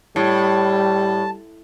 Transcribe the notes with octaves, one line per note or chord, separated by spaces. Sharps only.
A2 G3 A5